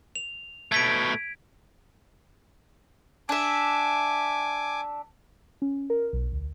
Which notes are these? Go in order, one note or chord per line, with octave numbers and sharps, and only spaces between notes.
F7
B2 A3 G#6 B6 D7
D4 E5 G#5 D6
C#4
A#4
B1
D2